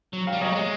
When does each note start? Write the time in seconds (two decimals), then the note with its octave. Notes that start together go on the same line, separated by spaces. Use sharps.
0.13 F#3
0.27 F5 G5
0.33 G3
0.41 F#3 C#5 D#5
0.52 A3
0.55 G#3